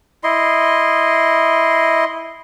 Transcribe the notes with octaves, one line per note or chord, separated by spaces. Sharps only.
E4 D#5 C6